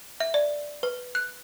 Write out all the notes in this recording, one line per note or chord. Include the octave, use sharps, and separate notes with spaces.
E5
D5
B4
F#6